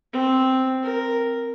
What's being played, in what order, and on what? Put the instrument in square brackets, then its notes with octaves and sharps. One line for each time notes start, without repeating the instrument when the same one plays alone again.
[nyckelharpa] C4
A#4